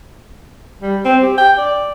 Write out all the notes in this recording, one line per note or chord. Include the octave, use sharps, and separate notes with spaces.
G3
C4
G4
G5
D5